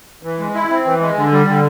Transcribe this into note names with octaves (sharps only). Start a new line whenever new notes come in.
E3
G#3
E4
C4
E3
G#3
D3
G3
D3